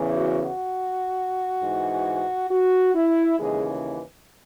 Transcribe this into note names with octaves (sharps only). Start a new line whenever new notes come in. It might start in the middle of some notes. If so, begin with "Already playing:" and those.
Already playing: E2 C#3 E3
F#4
F#4
G#2 E3
F#4
E4
D#2 C#3 E3 G#3